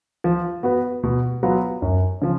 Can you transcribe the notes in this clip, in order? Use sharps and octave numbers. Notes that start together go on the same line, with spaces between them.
F3
B3 F#4 B4
B2
F#3 B3 F4 B4
F#2
C#3 F3